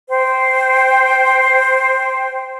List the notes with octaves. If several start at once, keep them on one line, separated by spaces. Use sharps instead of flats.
C5 G5